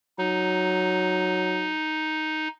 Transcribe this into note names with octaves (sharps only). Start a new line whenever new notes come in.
F#3 D#4